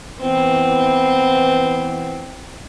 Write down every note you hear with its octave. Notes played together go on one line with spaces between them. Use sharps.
E3 B3 C4